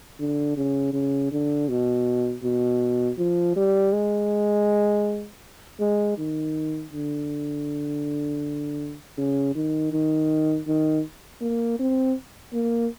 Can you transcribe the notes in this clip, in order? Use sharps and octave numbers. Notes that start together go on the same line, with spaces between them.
D3
C#3
C#3
D3
B2
B2
F3
G3
G#3
G#3
D#3
D3
C#3
D#3
D#3
D#3
A#3
C4
A#3